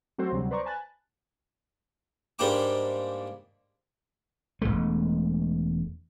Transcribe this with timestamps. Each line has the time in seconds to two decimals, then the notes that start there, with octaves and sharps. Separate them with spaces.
0.18 F#3 A3 C4 F#4 A4 C5
0.32 D2 C3 F#3 G3 C4
0.51 B4 C5 D5 A#5 C#6
0.66 G#5 A5 B5 F#6 A6
2.39 G#2 G3 A#3 D4 G5 D6
4.62 E1 D#2 G#3 A3